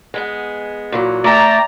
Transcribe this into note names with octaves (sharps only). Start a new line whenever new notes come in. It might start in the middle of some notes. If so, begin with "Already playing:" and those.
G#3 B3 G#4
A#2 E3 F#3
A3 D5 E5 G5 A#5